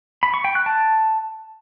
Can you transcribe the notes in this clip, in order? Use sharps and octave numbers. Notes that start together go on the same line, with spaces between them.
B5
C#6
G5
F#6
A5